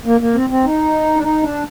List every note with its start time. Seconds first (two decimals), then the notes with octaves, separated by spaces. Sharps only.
0.05 A#3
0.21 A#3
0.35 C4
0.50 C4
0.65 D#4
1.16 D4
1.23 D#4
1.43 D4